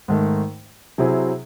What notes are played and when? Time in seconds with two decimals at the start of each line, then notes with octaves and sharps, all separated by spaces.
0.08 G#2 D#3 A3
0.98 C3 F#3 C4 E4 G#4